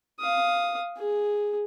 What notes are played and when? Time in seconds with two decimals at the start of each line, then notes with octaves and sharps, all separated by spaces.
0.20 F5 D#6
0.96 G#4